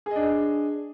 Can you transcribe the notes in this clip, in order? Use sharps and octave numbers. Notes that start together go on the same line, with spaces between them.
D4 G#4 D#5